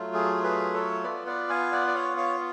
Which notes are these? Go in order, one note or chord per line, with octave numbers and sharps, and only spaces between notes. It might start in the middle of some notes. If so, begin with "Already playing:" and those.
Already playing: F#3 A3 F4
G#4
G#4 B4
A4 C#5
B3 F4 B4 D5
D5 F#5
F5 G#5
D5 F#5
D5
C#5 F5
C#5 F5